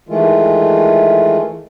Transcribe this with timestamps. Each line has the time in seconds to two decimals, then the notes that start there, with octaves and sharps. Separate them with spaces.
0.09 D#3 E3 G#3 A3 F4